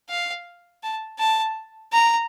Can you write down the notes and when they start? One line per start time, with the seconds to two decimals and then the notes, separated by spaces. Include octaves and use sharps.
0.09 F5
0.83 A5
1.19 A5
1.93 A#5